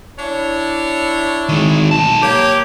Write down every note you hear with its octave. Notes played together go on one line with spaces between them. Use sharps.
D4 E4 C#5
D#3 G#3
B1 A5
A#3 G4 C#5